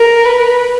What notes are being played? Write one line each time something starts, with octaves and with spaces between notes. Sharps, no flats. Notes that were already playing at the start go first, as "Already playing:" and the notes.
Already playing: A#4
B4